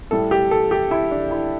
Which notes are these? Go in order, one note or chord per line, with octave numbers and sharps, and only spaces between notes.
A2 G3 A4
G4
A4
G4
E4
D4
E4